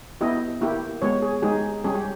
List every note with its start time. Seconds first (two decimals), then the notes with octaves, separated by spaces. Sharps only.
0.21 B3 E4 G4 D#5
0.61 A#3 E4 G4
1.02 G#3 B3 G4 C#5
1.22 G#4
1.42 G#3 D#4 G4 G#4
1.84 G3 C#4 G4 G#4
1.95 G4